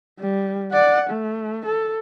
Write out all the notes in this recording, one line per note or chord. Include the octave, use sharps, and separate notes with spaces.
G3
D5 F#5
A3
A4